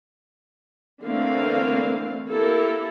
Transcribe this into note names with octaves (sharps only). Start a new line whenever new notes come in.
D3 E3 A3 A#3 C4 F5
A#3 E4 G4 A4 A#4